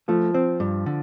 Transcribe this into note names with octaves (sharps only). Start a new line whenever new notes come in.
F3 A3
C4
G2
D3